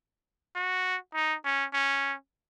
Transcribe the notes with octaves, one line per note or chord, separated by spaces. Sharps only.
F#4
D#4
C#4
C#4